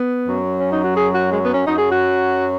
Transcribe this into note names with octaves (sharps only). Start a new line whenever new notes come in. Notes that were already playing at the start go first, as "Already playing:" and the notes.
Already playing: B3
F#2 F#3
C#4
D#4
F#4
G#4
F#4
G#3
B3
C#4
F#2 F#3 D#4
G#4
F#4